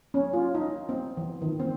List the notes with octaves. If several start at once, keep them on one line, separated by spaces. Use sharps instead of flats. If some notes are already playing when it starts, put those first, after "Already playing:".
C#4
F4
D#4
C4
E3
D#3
C4